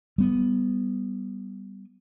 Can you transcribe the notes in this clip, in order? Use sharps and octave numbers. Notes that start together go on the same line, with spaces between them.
G3 B3